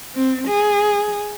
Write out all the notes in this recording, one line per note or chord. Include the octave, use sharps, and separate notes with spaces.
C4
G#4